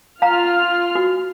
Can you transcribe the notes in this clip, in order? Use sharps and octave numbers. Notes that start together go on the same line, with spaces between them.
F4 F5 A#5 F6
F#4